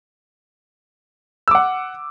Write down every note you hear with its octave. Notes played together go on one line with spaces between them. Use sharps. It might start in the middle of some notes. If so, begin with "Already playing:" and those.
F#5 D6 E6